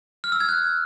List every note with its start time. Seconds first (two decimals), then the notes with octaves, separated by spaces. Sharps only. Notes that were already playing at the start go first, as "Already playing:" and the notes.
0.24 F6
0.32 E6
0.40 G#6
0.49 F#6